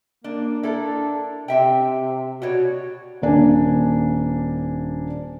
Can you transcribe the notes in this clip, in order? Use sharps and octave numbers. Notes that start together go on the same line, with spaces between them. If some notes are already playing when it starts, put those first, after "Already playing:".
A#3 D4
D4 E4 A4 A#4
C3 C4 E5 G5
B2 F#4 C#5 D5
D#1 A#3 D4 G#5